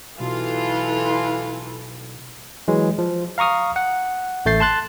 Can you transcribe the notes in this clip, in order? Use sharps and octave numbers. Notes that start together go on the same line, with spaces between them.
B1 E3 F4 A4
E3 F#3 G#3
F3
F5 A#5 C#6 D#6 F6
F#5
A1 A3 G6 A6 C7
A5 C6 F#6 A6